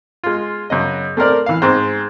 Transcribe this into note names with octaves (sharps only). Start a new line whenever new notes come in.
G#3 F4
F#2 C#3 D#5
A3 C4 A#4 D5
E3 F5
G#2 G#3 C4